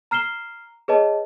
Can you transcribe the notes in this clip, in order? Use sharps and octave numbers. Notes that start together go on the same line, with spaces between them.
A#5 F6 C7 E7 G7
G#4 B4 C#5 D#5 A5